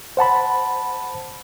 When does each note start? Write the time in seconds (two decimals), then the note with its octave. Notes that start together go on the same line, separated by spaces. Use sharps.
0.17 C5 F#5 A5 B5